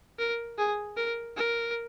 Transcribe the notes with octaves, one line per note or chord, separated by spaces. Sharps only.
A#4
G#4
A#4
A#4